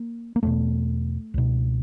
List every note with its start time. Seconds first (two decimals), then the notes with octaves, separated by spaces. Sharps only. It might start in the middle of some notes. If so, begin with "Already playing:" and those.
Already playing: A#3
0.36 A#3
0.43 E2 B2 A3
1.34 C#2 B2